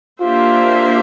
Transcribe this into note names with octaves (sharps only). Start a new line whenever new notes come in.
A#3 D4 F4 G4 C5 E5